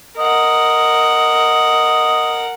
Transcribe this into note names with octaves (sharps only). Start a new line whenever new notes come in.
A#4 D#5 F#5